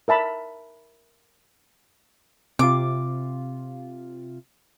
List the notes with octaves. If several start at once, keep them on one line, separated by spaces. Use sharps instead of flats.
A#4 E5 A5 B5
C3 F4 D6